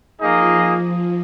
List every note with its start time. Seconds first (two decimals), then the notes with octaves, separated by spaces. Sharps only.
0.21 F3 A#3 D#4 G#4 D#5